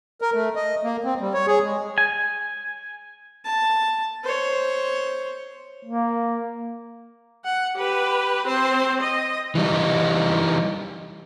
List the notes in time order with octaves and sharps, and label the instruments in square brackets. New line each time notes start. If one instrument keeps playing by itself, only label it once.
[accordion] A#4
A3
D#5
A#3
C4
G3
C#5
G#4
G#3
[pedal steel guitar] G#5
[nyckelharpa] A5
C5 C#5
[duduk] A#3
[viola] F#5
G4 B4
C4 C5
D#5
[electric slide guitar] E3 G3 D#4